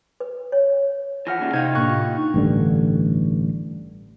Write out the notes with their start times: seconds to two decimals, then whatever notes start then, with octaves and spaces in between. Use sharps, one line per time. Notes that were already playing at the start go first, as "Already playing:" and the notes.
0.20 B4
0.52 C#5
1.27 E3 F3 F#5 F6 A#6
1.40 D#2 C#3 G3
1.53 C3 D#4 G4 F5 G6 G#6
1.75 A2 A#3 D4 C#6 F#6
1.90 F4
2.34 A1 G2 D3